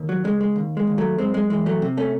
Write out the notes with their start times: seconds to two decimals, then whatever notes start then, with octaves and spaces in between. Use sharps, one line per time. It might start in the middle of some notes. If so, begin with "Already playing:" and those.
Already playing: D#2
0.09 F#3
0.24 C#3 G#3
0.41 G#3
0.56 D#2
0.77 G#3
0.87 D#2
0.98 F#3 A3
1.18 F#2 G#3 C4
1.34 G#3
1.50 E3 G#3
1.66 F#3 A3
1.82 C3
1.97 A3 C#4